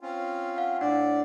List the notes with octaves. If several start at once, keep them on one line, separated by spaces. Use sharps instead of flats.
C4 C#4 F4
F5 F#5
A2 D4 D5 F#5